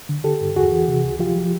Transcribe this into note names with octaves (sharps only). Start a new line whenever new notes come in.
D3
D3 G4 A4
G2
E2 F#4 G#4
E3
C3
C#2
F3 F4 G4
F3